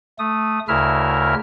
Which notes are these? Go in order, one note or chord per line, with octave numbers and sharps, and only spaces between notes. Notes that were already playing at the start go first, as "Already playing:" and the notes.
A3 D#6
D2 C#3 E4 A#4 E5 F6